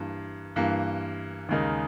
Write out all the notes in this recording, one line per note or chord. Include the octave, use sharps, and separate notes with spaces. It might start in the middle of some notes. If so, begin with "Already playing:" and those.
Already playing: G2 E3 A#3
G2 E3 A#3
D#2 C#3 G#3 D#4 A#4